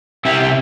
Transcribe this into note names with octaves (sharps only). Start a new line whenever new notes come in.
C3 E4 G4
C3 E4